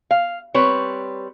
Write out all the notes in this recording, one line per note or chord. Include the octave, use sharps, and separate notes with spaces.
F5
G3 C4 B4 C#5